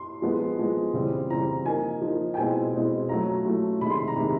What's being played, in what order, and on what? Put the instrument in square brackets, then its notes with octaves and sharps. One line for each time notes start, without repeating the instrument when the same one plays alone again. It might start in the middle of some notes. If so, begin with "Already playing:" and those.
Already playing: [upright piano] C6
F3 G#3 B3
F3 G#3 B3
C#3 E3 G3 C4 F4
C#3 E3 G3 C4 F4 A#5
F3 A#3 D#4 G#5
F3 A#3 D#4
G5
B2 G#3 C4 E4 G#5
B2 G#3 C4 E4
F#3 A3 C#4 F4 A#5
F#3 A3 C#4 F4
C3 D#3 G#3 B5
C6
A#5
C3 D#3 G#3 B5